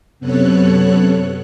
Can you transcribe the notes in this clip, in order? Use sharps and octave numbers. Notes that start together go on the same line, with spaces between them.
F#2 C3 B3 A4 C#5 F#6